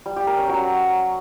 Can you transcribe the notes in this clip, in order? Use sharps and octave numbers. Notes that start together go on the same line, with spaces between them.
G3
G4
A#4
C#4
F#3